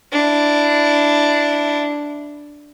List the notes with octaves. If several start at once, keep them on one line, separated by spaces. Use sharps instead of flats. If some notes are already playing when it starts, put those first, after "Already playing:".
D4 E4